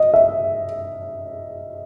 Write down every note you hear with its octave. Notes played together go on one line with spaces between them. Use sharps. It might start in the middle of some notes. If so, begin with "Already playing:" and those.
Already playing: D#5
E5